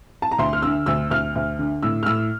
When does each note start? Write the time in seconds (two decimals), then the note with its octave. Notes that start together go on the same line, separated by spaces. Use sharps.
0.22 A5
0.31 A#5
0.38 D2 C6
0.53 F6
0.62 D3 E6
0.86 D2 E6
1.11 D2 F6
1.35 D2
1.59 D3
1.83 A2 E6
2.03 F6
2.06 A2 E6